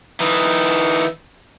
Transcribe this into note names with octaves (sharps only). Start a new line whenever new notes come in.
E3 D#4